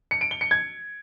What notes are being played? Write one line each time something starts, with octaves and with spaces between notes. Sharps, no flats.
C#7
D7
G7
C#7
G#6